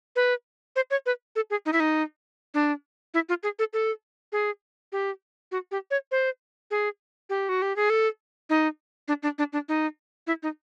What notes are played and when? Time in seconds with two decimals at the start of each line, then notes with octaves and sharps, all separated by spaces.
0.16 B4
0.76 C5
0.91 C#5
1.06 B4
1.36 A4
1.50 G#4
1.66 D#4
1.73 E4
1.80 D#4
2.54 D4
3.14 E4
3.29 F4
3.43 G#4
3.59 A4
3.73 A4
4.32 G#4
4.92 G4
5.52 F#4
5.71 G4
5.91 C#5
6.11 C5
6.71 G#4
7.30 G4
7.49 F#4
7.62 G4
7.76 G#4
7.90 A4
8.50 D#4
9.08 D4
9.23 D4
9.38 D4
9.53 D4
9.69 D#4
10.27 E4
10.43 D#4